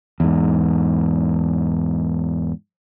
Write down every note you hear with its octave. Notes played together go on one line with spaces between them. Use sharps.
E2 G#2